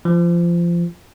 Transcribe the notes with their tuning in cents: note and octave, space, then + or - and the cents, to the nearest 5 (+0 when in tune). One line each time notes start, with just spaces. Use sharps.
F3 -25